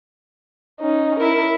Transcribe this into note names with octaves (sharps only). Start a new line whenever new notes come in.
C#4 D#4
E4 A#4